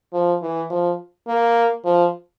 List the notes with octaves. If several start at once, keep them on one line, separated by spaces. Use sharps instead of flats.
F3
E3
F3
A#3
F3